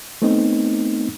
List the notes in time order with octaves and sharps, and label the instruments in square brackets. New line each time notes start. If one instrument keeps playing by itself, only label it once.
[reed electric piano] A3 B3 C4 D#4